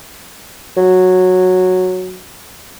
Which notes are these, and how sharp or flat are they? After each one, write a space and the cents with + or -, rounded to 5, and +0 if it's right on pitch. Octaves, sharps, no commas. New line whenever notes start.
F#3 -10